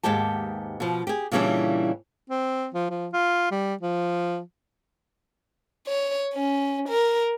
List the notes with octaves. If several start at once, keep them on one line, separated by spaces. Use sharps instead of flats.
D#2 G#2 G#3 B3 G4 A5
B2 F3
G4 G#4
A#2 C#3 E3 G3 C#4 D4
C4
F3
F3
F4
G3
F3
C#5
C#4
A#4